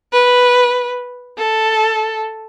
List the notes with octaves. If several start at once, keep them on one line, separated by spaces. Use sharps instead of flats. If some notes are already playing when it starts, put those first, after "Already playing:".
B4
A4